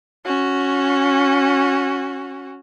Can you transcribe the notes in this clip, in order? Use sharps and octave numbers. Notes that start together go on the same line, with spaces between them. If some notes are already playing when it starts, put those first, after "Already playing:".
C#4 F#4